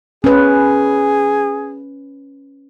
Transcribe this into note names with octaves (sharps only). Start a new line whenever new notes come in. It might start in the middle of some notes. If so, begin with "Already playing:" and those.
C#4 G#4 B4